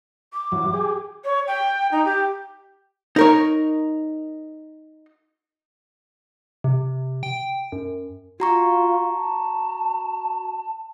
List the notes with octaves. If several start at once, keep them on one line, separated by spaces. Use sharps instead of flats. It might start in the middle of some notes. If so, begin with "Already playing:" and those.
D6
F#2 E3 F#3
G4 G#4
C#5
G5
D#4
G4
D#4 A#4 C#5
C3
G5
F#2
F4 F#4 A#5 C#6
A5